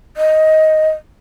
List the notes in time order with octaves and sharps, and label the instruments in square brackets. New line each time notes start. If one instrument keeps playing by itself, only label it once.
[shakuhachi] D#5